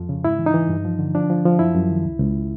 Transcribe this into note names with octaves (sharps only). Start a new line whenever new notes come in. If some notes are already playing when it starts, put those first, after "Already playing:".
Already playing: F2 F3
C#3
G#2 E4
E3
D#4
E3
G2
F3
D3
F3 D4
F3
F3
F#2 E4
F#2
D#3
C#2
C#2